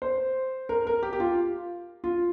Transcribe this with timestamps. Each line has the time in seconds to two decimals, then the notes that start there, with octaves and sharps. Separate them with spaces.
0.02 C5
0.69 A#4
0.87 A#4
1.03 G4
1.13 G4
1.20 F4
2.04 F4